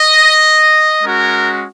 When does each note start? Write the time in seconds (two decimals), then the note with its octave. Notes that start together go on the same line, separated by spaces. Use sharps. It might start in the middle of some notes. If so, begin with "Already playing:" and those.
Already playing: D#5
1.03 G#3 C#4 F#4 A#4